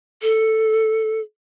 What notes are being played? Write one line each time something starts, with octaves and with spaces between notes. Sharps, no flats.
A4